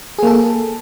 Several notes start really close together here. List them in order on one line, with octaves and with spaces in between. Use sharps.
G#4 A#3 A4